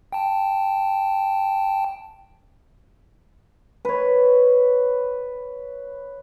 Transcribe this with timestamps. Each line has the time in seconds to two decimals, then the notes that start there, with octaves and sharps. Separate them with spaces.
0.12 G5 A5
3.85 B4 C#5